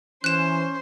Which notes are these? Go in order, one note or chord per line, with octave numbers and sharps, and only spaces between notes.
E3 C#4 C5 F#6 E7